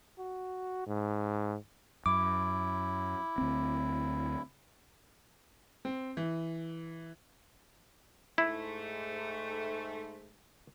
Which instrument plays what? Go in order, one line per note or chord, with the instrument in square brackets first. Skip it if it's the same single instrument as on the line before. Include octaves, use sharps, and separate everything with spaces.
[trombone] F#4
G#2
[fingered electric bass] F#2 [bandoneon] E4 [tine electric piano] D6
[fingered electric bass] D2 C4
[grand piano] C4
E3
[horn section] G#2 A3 [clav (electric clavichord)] E4